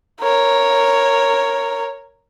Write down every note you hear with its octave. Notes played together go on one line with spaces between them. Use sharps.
A#4 C#5